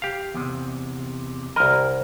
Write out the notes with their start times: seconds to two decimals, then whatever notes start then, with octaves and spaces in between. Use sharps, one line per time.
0.02 G4 F5
0.34 E2 C3
1.56 C2 A#4 D#5